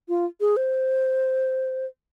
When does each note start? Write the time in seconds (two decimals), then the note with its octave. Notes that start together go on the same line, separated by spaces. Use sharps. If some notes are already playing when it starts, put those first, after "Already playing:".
0.09 F4
0.41 G#4
0.57 C5